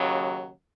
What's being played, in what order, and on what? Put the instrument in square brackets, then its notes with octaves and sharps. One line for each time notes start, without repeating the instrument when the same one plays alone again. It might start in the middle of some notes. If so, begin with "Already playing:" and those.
Already playing: [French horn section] D#2 C#3 F#3